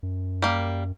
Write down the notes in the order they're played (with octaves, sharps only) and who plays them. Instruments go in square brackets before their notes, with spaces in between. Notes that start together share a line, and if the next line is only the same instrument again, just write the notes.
[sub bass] F#2
[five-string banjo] G3 A#3